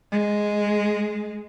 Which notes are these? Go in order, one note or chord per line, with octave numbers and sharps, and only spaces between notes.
G#3